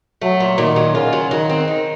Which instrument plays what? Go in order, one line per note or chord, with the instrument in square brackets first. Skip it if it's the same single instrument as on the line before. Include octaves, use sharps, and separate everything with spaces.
[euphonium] F#3 [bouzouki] A3
[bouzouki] A#2
[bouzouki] A#2 [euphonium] D#3
[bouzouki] F#3
[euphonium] C#3 [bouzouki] F4
[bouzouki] F#3
[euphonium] D#3 [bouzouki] F#3
[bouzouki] C4
D#4